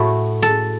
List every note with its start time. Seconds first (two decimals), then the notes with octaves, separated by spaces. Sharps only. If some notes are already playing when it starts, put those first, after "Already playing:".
Already playing: A2 A3 E4 F#4
0.42 A4